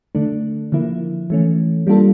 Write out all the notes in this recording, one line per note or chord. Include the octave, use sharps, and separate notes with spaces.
D3 A3 D4
D3 F3 A#3 E4
E3 A3 C#4
G3 A#3 D4 F4 A4